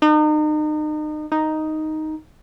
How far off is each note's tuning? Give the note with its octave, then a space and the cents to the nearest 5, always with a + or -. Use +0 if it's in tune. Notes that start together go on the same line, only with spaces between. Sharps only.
D#4 -35
D#4 +0